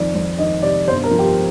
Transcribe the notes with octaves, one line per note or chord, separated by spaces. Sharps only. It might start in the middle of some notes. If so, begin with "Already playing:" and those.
Already playing: F2 D#3 D5
F2
D#3 D#5
C3 D5
G1 C5
A#4
F3
G4